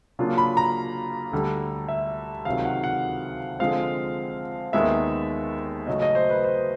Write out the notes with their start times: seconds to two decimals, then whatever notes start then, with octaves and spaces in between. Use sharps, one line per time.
0.19 C#3 F#3 A#3 D4 F4
0.38 B5
0.57 A#5
1.32 D2 D3 G3
1.89 E5
2.45 C#2 C3 D#3 F#3 F5
2.65 F#5
2.84 F#5
3.59 D3 F3 G#3 C4 F5
4.73 D#2 D#3 G#3 B3 E5
5.87 C#3 F#3 A3 D#5
6.02 D#5
6.15 C5
6.30 B4
6.44 C5